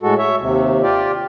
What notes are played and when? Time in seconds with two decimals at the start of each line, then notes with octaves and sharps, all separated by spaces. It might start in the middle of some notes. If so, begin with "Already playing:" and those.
0.03 A2 G#3 F#4 A4
0.18 C#5 E5
0.40 D#2 C3
0.82 F4 G4 D5